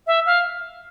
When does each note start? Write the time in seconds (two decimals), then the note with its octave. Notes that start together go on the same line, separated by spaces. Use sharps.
0.07 E5
0.26 F5